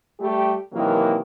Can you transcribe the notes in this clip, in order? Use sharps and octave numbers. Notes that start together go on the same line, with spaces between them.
G3 A3 G4
C3 D#3 E3 F#3 A#3